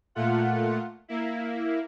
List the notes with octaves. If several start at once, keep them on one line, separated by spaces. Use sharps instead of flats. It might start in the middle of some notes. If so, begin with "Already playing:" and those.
A#2 A3 F4 F#5
A#3 E4